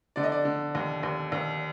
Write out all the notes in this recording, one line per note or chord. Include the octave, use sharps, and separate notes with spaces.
D3 D5
D#5
D5
D3
D#2
D#2
D#2